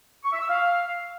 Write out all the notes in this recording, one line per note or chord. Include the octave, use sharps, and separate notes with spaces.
C#6
E5
E6
F5